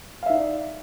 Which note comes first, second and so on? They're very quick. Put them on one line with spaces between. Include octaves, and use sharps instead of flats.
F5 E5 D#4 D5